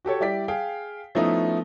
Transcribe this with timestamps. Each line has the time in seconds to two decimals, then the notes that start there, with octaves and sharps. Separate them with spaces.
0.05 F#4 G4 A4 C#5
0.20 G3 E4 G4 D5 B6
0.48 G#4 F5 G5
1.15 F3 A3 B3 C#4 D#4 E4